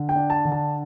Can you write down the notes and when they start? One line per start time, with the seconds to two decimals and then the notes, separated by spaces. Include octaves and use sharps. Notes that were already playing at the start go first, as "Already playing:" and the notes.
Already playing: D3
0.09 G5
0.16 D4
0.30 A5
0.45 D3
0.52 A5